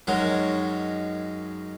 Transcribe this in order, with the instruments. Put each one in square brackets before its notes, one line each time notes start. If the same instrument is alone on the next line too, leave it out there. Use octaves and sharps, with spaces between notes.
[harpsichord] F#2 D#3 F#3 G#3